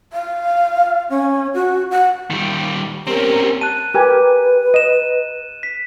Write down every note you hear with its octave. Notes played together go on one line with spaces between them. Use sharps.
F5
C#4
F#4
F#5
D#3 G3
C4 C#4 G4 A#4
A5 F#6 D#7
G4 A#4 B4 G#5
D#5 D#7 E7
B6